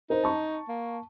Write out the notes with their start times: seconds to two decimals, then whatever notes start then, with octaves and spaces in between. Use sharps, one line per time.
0.10 D#4 A#4 C5
0.23 A5 C#6
0.68 A#3